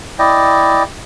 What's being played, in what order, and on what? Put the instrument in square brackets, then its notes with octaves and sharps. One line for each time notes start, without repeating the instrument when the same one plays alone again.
[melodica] E4 D5 D#5 G5